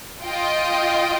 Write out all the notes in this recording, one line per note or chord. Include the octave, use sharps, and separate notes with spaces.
F4 D#5 G5